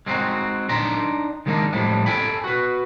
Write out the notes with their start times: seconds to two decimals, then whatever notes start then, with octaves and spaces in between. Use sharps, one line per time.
0.06 G#3 C4 D#4 F#4
0.69 D4 D#4 G5 A#5 C6
1.46 D#3 G#3 A#3 B3 D4 D#4
1.73 A2 F3 G3 G#3
2.06 A4 G5 G#5 B5
2.44 F#4 B4